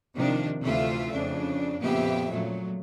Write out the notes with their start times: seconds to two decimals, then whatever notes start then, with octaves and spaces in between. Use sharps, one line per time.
0.15 C3 D#3 F3 D4
0.62 D2 C3 E3 A3 F4 E5
1.12 F2 C#3 D4
1.81 F2 A#2 C#3 B3 G4 E5
2.30 A#2 C#3 F#3 A3